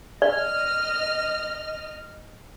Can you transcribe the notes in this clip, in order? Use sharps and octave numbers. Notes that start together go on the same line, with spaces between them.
D5 D#5 F6